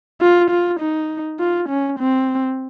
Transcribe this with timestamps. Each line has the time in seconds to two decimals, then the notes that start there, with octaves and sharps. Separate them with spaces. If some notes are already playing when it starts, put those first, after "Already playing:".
0.21 F4
0.50 F4
0.80 D#4
1.40 F4
1.69 C#4
1.99 C4